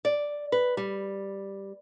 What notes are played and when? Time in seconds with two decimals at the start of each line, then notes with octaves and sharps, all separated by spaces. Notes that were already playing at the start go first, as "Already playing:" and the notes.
0.05 D5
0.52 B4
0.77 G3